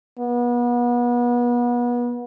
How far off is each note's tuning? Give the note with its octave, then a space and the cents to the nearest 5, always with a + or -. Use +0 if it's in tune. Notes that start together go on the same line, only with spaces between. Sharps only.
B3 -35